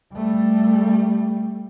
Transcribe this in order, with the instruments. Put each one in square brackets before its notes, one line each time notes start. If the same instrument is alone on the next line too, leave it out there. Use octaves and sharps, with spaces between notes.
[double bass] G3 A3